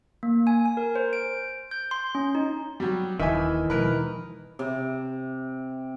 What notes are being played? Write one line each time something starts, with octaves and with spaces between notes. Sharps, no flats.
A#3
G#5
G#5
A#4
C5
D7
G6
C6
C#4
D#4
F#3 G3
D#1 D#2 D#3 E3 E5 G#5
B2 F3 G#3 A#4 B4
C3